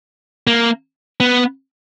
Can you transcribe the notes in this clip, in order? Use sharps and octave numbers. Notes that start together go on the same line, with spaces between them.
A#3
B3